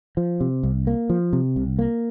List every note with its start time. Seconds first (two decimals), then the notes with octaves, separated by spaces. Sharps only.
0.17 F3
0.41 C3
0.63 C2
0.87 A#3
1.10 F3
1.33 C3
1.56 C2
1.79 A#3